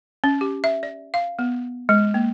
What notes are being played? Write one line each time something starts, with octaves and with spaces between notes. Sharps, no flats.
C#4
G4
E5
D5
F5
B3
G#3
A#3